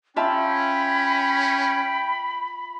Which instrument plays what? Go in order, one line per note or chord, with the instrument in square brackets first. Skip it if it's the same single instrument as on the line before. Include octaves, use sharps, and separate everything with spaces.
[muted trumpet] C#4 [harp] F4 E5 A5 [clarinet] G5 [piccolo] B5